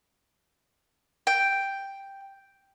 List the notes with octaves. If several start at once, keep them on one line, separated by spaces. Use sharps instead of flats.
G5